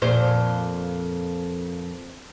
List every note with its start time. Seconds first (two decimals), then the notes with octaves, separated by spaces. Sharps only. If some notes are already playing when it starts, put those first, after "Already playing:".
0.02 F2 A#2 C5